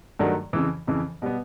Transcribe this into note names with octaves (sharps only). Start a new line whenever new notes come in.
G2 D#3 F#3 A3 D4
F2 C#3 E3
F2 C#3 E3
B2 G3 B3